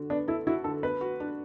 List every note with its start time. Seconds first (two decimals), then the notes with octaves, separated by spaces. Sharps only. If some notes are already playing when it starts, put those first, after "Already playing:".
Already playing: D3 F#4
0.10 B3 D4
0.28 E4 A4
0.47 E4 F#4
0.64 D3 A4
0.83 B3 B4
1.01 F#4
1.20 D4